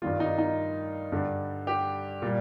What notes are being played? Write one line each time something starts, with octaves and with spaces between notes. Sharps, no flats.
G2 D#3 G3 F4
D#4
D#4
G2 D3 G3
G4
A#2 G3